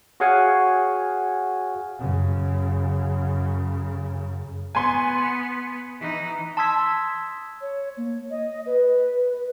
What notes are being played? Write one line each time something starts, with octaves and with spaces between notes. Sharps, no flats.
F#4 G#4 C#5 F5 F#5 G#5
F#2 C#3
B3 G#5 C6
E3 D#4
A5 C6 D#6 E6 G#6 B6
C#5
A#3
D#5
B4